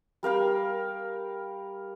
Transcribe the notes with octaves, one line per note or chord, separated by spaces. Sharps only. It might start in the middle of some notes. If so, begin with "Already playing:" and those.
G3 A#4 F5 G5